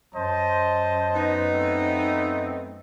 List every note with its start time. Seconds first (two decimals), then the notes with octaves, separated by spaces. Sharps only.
0.14 F#2 C5 D#5 A5
1.14 B3 D#4
1.51 A3 C4